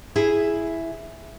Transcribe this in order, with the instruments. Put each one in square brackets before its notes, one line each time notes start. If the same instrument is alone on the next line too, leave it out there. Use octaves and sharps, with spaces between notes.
[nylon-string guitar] E4 G#4